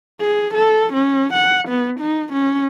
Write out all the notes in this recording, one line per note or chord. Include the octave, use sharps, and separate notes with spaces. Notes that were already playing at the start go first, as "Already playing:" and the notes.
G#4
A4
C#4
F#5
B3
D#4
C#4